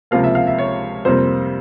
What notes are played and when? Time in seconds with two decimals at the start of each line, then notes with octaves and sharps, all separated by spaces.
0.11 C#2 C3 F3 A#3 F5
0.24 E5
0.35 F5
0.47 E5
0.58 C#5
1.05 F2 C3 G3 A#3 C5